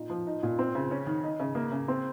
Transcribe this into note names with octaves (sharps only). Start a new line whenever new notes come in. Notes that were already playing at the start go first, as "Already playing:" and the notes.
Already playing: A#2 D#4
F3
D#4
A#2
C4
C#3
C#4
D#3
D#4
C#3
A#3
C#3
C4